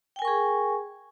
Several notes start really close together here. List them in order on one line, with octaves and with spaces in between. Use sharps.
G5 G#5 A#4 C#6 G#4